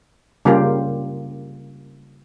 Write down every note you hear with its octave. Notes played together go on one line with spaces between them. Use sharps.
C#3 G3 A#3 F4 G4 A#4